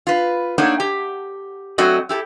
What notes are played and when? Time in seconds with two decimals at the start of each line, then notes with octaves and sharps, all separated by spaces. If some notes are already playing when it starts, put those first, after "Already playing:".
0.07 F4 B4
0.58 A3 A#3 D4 D#4 C#5 F#5
0.80 G4
1.78 F#3 A3 C4 F#4 D5 D#5
2.09 E4 G4 A4